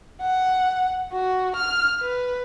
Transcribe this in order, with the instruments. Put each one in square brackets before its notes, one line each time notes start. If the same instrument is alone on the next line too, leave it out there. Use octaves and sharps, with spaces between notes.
[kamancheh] F#5
F#4
F6
B4